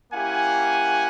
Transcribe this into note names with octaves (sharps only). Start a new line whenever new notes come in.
A#3 C#4 E4 G4 F#5 G#5